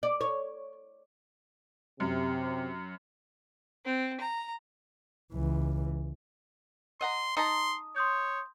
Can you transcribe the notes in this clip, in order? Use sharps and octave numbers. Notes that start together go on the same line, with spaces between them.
D5
C#5
F#2 C3
C4
A#5
C#2 E3
D#5 F#5 A#5 C6
D#4 A5 A#5 C6 D#6
C#5 C6 D#6 G6